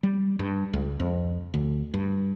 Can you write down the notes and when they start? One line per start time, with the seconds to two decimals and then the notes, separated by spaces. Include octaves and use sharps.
0.03 G3
0.39 G2
0.73 C#2
1.00 F2
1.54 D2
1.94 G2